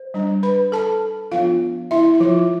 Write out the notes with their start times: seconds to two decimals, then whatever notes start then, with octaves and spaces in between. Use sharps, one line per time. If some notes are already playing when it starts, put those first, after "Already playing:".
Already playing: C5
0.14 G3 D4
0.43 B4 B5
0.72 A4 A5
1.32 F3 B3 D4 F4 F5
1.91 E4 E5
2.14 E4
2.21 F3 F4